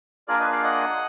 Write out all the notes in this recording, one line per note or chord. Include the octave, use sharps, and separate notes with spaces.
A#3 D4 F4 G#4 A#4 D5
B4 D#5
D5 F5
D#5 F#5